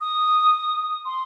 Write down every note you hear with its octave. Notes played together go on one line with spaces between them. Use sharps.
D#6
C6